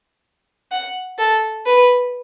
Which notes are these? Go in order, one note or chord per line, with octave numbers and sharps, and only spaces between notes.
F#5
A4
B4